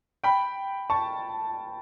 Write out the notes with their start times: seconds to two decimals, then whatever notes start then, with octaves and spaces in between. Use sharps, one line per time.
0.24 G5 B5
0.90 A5 C#6